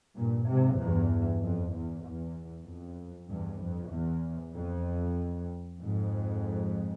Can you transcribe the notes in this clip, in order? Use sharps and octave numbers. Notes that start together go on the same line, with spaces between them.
G2 A#2
G#2 C3
E2 G2
F2
E2
E2
F2
E2 G2
F2
E2
F2
F2 G#2